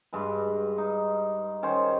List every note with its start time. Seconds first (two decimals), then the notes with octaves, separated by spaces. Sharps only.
0.13 G2 G#3 B4
0.78 D#4
1.63 D#3 C#4 C5